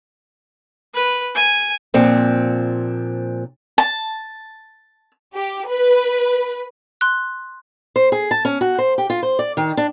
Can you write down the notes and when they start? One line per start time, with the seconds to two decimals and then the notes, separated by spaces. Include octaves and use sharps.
0.94 B4
1.35 G#5
1.94 A#2 F3 C4 D4
3.78 A5
5.35 G4
5.69 B4
7.01 C6 F#6
7.96 C5
8.12 G#4
8.31 A5
8.45 C#4
8.61 F#4
8.78 C5
8.98 G4
9.10 F4
9.23 C5
9.39 D5
9.57 D#3
9.77 D4